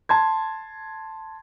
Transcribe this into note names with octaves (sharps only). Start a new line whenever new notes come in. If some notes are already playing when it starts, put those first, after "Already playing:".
A5 C6 G#6